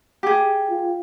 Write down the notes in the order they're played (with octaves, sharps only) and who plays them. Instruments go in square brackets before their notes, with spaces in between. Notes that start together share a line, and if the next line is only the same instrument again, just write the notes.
[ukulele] G4 G#4
[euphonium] F4